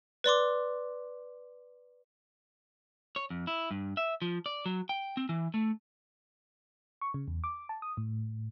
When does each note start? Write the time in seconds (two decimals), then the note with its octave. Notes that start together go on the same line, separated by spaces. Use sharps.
0.24 B4 D5 C6 D6
3.16 C#5
3.30 F2
3.47 E4
3.71 G2
3.97 E5
4.22 F3
4.46 D5
4.66 F#3
4.89 G5
5.17 C4
5.29 E3
5.54 A3
7.01 C#6
7.14 C#3
7.28 E2
7.44 D6
7.69 A5
7.82 D#6
7.97 A2